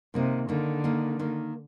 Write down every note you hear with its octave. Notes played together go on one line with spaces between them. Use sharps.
C3 D#3 A#3 D#4
D3 D#3 A#3 D#4
D#3 A#3 D#4
D#3 A#3 D#4